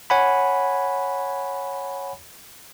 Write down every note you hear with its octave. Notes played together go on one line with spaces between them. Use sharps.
C#5 F#5 G#5 B5